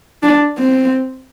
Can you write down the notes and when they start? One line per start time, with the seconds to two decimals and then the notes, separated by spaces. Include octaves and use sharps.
0.23 D4
0.58 C4